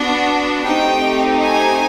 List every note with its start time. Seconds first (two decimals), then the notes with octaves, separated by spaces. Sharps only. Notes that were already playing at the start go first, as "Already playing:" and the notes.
Already playing: B3 D4 F#4
0.66 A3 C4 D#4 G4 G5
1.42 G#5